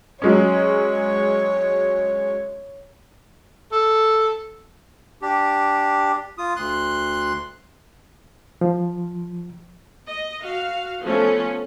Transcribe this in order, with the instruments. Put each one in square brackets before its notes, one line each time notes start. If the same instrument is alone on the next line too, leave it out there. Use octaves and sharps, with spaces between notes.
[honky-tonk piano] F#3 G#3 C#4 [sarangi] C#5
[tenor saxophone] A4
[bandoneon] D4 G4
F4 D#6
D2 C6 F#6
[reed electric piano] F3
[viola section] D#5
F#4 F5
F3 A3 B3 C#4